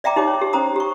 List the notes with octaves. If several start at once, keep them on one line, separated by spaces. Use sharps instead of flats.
D5 E5 G5 A#5 D6
D#4 G4 C#5 D6
C#5
G4
C#4 C5 A#5 D#6
G4 C#6